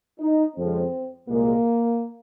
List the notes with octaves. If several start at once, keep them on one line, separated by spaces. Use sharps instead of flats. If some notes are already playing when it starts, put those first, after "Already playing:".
D#4
F2 C#3 F3 G#3 C4
C2 A#2 G#3 A#3